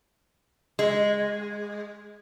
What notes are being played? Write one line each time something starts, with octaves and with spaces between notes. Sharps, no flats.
G#3